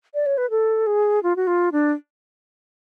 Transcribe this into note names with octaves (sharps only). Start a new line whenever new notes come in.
D5
C#5
B4
A4
G#4
F4
F#4
F4
D4